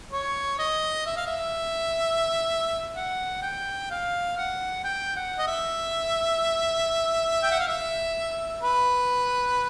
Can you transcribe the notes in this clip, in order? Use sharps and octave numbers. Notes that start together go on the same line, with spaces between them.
C#5
D#5
E5
F5
E5
F#5
G5
F5
F#5
G5
F#5
D#5
E5
G5
F#5
F5
E5
B4